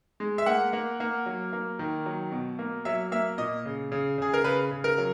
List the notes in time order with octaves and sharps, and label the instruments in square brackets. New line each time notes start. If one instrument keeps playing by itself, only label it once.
[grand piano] G#3
E5
A#3 F#5
A#3
A#3
F#3
A#3
D#3
F#3
B2
A#3
F#3 E5
A#3 E5
A#2 D#5
C#3
C#3
C#3 G#4
A#4
C#3 B4
C#3
A#4
F#3